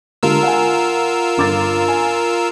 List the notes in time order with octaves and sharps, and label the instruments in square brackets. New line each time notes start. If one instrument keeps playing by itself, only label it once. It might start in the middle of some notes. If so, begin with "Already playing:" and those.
[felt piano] D3 G#3 G4 [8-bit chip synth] F4 A#4 E6
[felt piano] F#5 G#5
G1 D6 A6
G#5